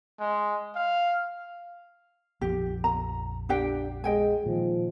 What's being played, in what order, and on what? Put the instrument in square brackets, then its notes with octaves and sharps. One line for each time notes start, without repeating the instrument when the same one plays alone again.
[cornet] G#3
F5
[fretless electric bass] A#1 F2 F3 [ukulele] G4
[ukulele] A#5
D4 G4 G5
[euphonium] G#3 [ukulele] D#5 G5 G#5
[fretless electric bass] A#2 D#3 [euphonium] F3